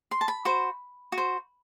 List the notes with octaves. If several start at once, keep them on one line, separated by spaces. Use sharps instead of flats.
C6
A5
B5
F#4 C5
F#4
C5